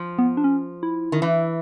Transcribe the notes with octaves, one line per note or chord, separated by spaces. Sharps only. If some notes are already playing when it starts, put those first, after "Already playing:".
Already playing: F3
B3
D4
C#4
E4
D#3
E3